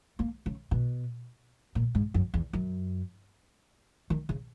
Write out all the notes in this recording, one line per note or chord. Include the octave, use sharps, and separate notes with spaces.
A#3
C#3
B2
A#2
G#2
F#2
E2
F#2
D#3
C#3